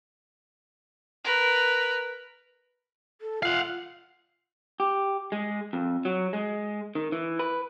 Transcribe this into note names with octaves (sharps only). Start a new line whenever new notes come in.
A#4 B4
A4
F4 F5 F#5
G4
G#3
F2
F#3
G#3
D#3
E3
B4